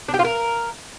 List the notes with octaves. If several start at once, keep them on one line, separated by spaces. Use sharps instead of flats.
D4
G4
F4
A#4